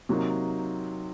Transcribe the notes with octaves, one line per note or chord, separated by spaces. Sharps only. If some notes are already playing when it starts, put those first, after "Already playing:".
C3 F#3 A#3 D#4